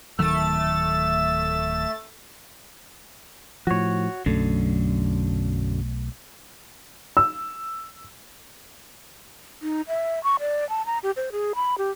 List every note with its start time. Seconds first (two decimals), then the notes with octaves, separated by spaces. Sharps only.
0.19 D1 D#3 F#3 A3 E6 A6
3.67 A2 F3 F#4 C#5
4.26 B1 F#2 D3 A3
7.17 E6
9.62 D#4
9.88 E5
10.24 C#6
10.40 D5
10.69 A5
10.86 A#5
11.03 G4
11.16 C5
11.32 G#4
11.55 B5
11.78 G4